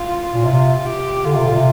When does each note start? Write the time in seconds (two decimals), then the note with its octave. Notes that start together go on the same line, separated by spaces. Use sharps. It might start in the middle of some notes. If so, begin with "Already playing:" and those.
Already playing: F4
0.34 A#2
0.44 C3 F4
0.85 G4
1.25 D3 F4
1.35 C3
1.44 A#2
1.54 C3